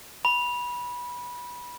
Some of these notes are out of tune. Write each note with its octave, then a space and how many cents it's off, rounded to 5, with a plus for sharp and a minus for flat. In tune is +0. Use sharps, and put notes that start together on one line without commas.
B5 -20